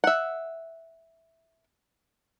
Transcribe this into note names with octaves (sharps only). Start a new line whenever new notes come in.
E5 F#5